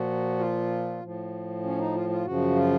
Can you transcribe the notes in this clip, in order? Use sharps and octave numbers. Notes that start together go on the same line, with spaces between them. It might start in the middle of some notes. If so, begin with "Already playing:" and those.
Already playing: A#2 F3 F#4
F4
A2 F3
C#4
D#4
F4
F4
F#2 C#3 F3 F#4
F4